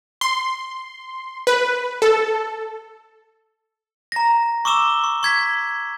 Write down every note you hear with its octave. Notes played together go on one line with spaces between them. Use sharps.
C6
B4
A4
A#5 A#6
C#6 D6 E6 E7 G7
C#6
C#6 G#6 B6